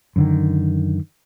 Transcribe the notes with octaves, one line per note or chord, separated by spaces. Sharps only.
F#2 D3 D#3